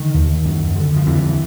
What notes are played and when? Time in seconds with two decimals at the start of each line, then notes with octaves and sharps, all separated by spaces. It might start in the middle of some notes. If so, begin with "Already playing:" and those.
Already playing: D3 D#3
0.14 D#2
0.45 F#2
0.76 D3
0.96 F3
1.07 F2 D3 E3